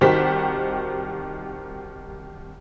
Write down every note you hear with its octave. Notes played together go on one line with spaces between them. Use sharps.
C2 D#3 F#4 G4 C5 B6